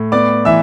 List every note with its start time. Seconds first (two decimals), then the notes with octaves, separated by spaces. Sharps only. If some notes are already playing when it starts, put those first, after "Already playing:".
Already playing: A2
0.12 B3 D5 D6
0.45 E3 E5 E6